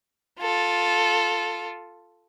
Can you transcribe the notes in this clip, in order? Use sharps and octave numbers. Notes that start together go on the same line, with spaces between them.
F4 A4